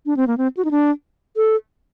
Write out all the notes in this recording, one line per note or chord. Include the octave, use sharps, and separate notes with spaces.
D4
C4
A#3
C4
F#4
D#4
D4
A4